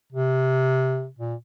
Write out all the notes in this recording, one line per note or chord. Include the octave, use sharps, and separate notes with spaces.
C3
A#2